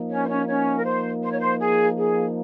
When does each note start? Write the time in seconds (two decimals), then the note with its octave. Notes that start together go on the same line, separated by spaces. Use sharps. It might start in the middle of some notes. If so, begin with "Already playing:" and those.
Already playing: F3 A#3 D#4
0.11 C#4 C#5
0.23 C5
0.29 C#4 C#5
0.47 C#4 C#5
0.77 A#4
0.85 C5
1.23 C5
1.31 C#5
1.39 C5
1.60 G#4
1.97 G#4